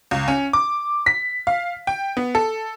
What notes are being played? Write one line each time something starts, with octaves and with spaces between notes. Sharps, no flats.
C#2
C#4
D6
B6
F5
G5
B3
A4